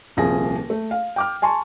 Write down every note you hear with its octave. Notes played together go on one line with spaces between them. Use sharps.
D#1 C2 F3 G#4 A#6
A3
F5
G5 D6 F6
G#5 A5 C6 C#6